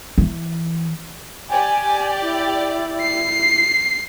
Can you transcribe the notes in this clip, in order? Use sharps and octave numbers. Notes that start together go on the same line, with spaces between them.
E3
G4 D5 G#5
E4
C7